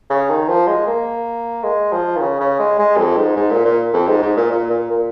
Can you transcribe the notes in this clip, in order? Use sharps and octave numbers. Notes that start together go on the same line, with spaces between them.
C#3
D#3
F3
G#3
A#3
G#3
F3
D#3
C#3
C#3
G#3
G#3
F2
G#2
G#2
A#2
A#2
F2
G#2
G#2
A#2
A#2
A#2
A#2